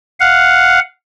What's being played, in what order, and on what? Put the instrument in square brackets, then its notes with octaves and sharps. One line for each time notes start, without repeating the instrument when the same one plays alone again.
[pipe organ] F5 F#5